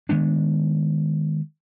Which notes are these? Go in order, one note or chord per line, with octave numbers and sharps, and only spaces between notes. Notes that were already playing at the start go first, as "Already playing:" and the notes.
D#3 G#3 B3 D4